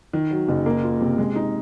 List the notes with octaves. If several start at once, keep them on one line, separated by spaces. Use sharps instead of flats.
D#3
F#3
F#1
A#3
F4
C3
G#3
D#4